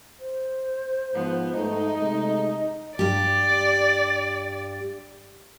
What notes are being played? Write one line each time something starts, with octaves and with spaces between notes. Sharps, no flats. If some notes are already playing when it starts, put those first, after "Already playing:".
C5
G#2 F3 B3
G#2 A3 D#4
C3 G#3 A3 D#5
G2 G4 D5